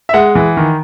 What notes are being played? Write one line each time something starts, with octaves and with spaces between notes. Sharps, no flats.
E5
G#3 F#5
E3
D#3